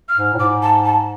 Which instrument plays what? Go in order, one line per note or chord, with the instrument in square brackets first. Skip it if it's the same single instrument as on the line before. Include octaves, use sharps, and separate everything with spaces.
[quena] F6
[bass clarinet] G#2
A2
[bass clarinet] G#2 [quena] D6
[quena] A5
A5